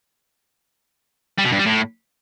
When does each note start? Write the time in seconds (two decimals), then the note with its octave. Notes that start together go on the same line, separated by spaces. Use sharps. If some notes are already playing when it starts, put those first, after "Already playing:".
1.38 G3
1.45 B2
1.52 G2
1.59 G3
1.66 A2